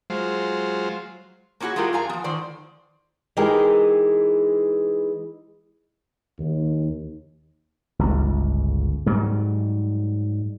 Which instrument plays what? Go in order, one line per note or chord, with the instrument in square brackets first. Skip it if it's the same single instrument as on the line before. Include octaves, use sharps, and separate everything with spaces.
[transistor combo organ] F#3 G#3 F4 C5
[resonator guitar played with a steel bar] A#3 C#4 E4 F#4 G#4
G#3 C#4 E4 F4 G4 A#4
F#2 D4 F5 G#5 A#5
F3 B3
A2 D#3 C5 D5
[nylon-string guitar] E3 G#3 D#4 G4 G#4 A#4
[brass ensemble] D#2
[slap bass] G1 C#2
G#2 F#3 G3